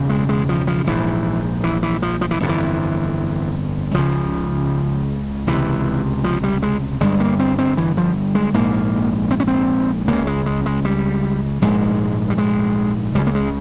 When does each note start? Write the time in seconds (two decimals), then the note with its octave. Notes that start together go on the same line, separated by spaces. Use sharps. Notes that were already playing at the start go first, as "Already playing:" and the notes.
Already playing: E1 E2 C#3
0.09 G#3
0.29 G#3
0.49 F3
0.67 F3
0.87 A#1 G#2 E3
1.64 E3
1.83 E3
2.02 F3
2.21 F3
2.31 E3
2.40 G1 F2 C3
2.49 E3
3.94 C#2 C#3 F3
5.47 C#2 C3 E3
6.24 F3
6.44 G3
6.62 G#3
7.00 G1 G2 G#3
7.20 A#3
7.39 C4
7.58 C4
7.77 E3
7.97 F3
8.35 G#3
8.54 A#1 G#2 A#3
9.31 C4
9.40 C#4
9.47 C4
10.08 C#2 C#3 A#3
10.27 G#3
10.46 G#3
10.66 G#3
10.85 G3
11.62 A#1 G#2 G#3
12.30 G3
12.38 G#3
13.15 C#2 C#3 G3
13.27 A#3
13.35 G#3